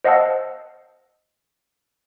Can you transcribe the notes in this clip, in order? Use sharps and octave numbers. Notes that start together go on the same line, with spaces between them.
C5 D#5 F5 F#5 A5 E6